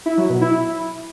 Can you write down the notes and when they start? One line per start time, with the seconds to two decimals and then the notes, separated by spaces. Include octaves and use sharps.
0.06 E4
0.18 F#3
0.29 B2
0.41 E4